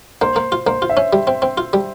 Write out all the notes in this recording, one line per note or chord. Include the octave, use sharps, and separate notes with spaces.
A#3 C5
A#3
F4
A#3 C5
F4
E5
C#4
G3
C4
C4
F4
G3